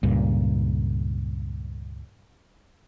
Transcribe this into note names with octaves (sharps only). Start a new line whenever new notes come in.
C#2 G2 A#2